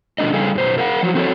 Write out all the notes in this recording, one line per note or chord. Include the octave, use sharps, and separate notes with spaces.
B2 F3 A3 B3 D4 D#5
C#3 G3 G#4 A4 F5 G#5
F#2 B2 C5
A#4 F5 F#5
F3 F#3
C4 F#4 A4 C5 C#5